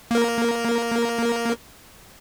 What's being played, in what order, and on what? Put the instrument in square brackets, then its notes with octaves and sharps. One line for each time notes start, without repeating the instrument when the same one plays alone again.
[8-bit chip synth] A#3 A#4